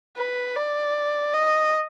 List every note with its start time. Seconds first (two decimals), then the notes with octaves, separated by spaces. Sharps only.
0.17 B4
0.56 D5
1.34 D#5